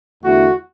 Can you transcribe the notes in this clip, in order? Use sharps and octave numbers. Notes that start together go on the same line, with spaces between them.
E2 D3 A3 E4 F#4